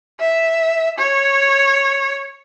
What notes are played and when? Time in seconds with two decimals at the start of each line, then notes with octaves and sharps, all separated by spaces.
0.20 E5
0.98 C#5